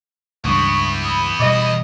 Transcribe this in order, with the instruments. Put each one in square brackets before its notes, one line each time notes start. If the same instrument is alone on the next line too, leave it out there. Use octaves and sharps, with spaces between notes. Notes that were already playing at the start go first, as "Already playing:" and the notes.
[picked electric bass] C#2 G2 [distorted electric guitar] E3 B3 [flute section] C#6 D#6
[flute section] B5 D#6
[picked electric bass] B2 G3 [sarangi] D#5